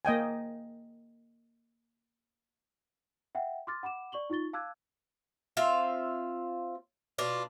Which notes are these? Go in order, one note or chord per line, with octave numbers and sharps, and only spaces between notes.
A#3 D#5 G5 G#5
E5 F#5 G5
C6 D6 F6 A6
F#5 B5 D6 E7
D5 C#6 F#7 G7
D#4 F4 C#6 A6 G7
F5 A5 D6 E6 F#6 G#6
C4 F4 E5 F5
B2 D4 F4